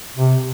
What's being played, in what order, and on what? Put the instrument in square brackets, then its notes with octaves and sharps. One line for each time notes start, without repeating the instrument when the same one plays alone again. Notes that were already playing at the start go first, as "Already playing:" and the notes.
[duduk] C3